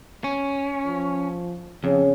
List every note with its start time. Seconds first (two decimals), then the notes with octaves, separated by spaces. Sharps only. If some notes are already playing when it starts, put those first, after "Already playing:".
0.24 C#4
0.86 F3
1.84 F2 C#3